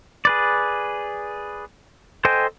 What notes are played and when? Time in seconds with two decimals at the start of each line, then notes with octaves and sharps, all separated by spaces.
0.25 G#4 B4 D5
2.25 A4 C5 D#5 G5 G#5